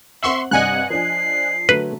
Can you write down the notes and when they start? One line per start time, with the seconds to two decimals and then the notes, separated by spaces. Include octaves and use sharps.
0.23 C4 E5 F#5 C6 C#6 F#7
0.51 G2 C3 D5 D#5 F#5 G#5 F#6
0.90 F3 D4 C7
1.69 D3 F#3 A3 B4